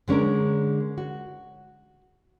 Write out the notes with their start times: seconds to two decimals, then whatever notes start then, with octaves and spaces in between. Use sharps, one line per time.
0.08 D3 G#3 C#4 D4 A#4
0.98 F#4